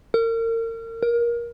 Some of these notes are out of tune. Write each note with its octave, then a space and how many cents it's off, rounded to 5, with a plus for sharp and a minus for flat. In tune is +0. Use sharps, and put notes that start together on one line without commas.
A#4 -35
A#4 +20